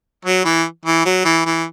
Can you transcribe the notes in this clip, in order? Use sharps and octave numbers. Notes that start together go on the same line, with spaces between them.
F#3
E3
E3
F#3
E3
E3